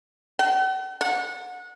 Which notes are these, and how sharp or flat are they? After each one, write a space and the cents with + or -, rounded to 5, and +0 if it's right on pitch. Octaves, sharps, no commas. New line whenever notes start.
F#5 +45
F#5 -25